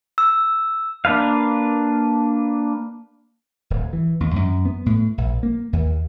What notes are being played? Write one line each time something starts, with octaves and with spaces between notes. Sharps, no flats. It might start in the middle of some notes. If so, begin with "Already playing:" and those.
E6
A#3 D4 B4 F5
D1
E3
D#2
F#2
B3
A2
A#1
A#3
D#2